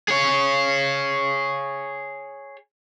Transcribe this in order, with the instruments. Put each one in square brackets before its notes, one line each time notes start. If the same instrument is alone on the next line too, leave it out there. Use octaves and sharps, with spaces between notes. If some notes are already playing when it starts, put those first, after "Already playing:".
[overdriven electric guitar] G#4 C#5